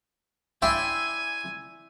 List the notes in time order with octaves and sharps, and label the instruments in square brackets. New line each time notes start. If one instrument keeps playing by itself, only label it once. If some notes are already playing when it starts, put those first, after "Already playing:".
[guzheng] E4 D5 [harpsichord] E5 G5 C6 [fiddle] G#5